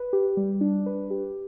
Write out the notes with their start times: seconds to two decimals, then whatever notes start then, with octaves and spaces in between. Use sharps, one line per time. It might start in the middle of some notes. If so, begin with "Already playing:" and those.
Already playing: B4
0.13 G4
0.37 G3
0.61 D4
0.86 B4
1.11 G4